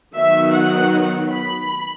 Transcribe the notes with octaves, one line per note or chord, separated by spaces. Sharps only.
D#3 F#3 B3 E5
F#5
B5